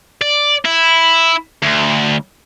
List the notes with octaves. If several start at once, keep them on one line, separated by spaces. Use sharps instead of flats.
D5
E4
D2